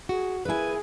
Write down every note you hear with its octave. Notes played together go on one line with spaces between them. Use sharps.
F#4 G#4
A#3 E4 G#4 B4 G#5